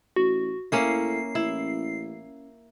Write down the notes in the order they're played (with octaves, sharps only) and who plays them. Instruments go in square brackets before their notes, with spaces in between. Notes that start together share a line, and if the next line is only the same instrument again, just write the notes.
[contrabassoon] A1 [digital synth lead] F#4
[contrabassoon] A2 [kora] A#3 C#4 E4 [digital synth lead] C7
[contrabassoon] A1 [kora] E4